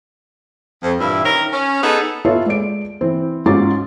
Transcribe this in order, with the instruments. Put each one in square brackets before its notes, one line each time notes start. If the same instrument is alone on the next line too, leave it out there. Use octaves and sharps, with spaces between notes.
[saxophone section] F2
G2 A#2 E3 E4
D#3 C#4 A#4
C#4
B3 D#4 G#4 A4
[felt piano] B3 F4 A4 C#5 E5
G#3 D5 D7
E3 C4
G#2 C#4 F4 F#4 D6 A6